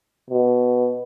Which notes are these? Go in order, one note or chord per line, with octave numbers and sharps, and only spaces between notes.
B2